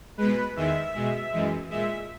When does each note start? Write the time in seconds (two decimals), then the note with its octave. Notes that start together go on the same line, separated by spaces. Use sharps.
0.18 B2 G#3 B4
0.55 E2 D#3 G#3 E5
0.94 B2 G#3
1.32 F#2 E3 G#3
1.70 A#2 G#3 E5